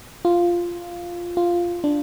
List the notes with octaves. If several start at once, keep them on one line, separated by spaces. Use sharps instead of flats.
F4
F4
D4